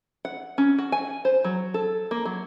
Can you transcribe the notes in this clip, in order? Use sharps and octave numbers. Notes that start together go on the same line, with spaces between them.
F#5
C#4
F#4
G#5
C5
F#3
A4
A#3
F#3